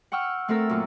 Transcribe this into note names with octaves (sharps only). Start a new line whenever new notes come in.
F#5 G5 C#6 E6 F6
A3 C4 A4 A#4 E6
F#2 A#2 A4